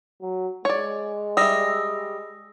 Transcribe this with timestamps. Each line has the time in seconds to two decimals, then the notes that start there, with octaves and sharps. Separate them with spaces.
0.21 F#3
0.65 G#3 C#5 D5
1.37 G3 E5 D#6 E6 A#6